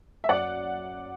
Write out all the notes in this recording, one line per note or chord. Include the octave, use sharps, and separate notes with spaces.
E5
F#2 D5 F#5